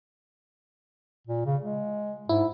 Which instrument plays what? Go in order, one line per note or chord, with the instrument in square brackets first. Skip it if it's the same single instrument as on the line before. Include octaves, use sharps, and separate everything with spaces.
[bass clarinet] A#2
C#3
G#3
[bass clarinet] G#2 [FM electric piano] E4